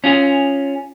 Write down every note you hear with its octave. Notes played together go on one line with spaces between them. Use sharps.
C#4 F4 G#4